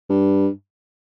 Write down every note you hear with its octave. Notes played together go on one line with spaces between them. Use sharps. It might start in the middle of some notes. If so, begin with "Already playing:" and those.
G2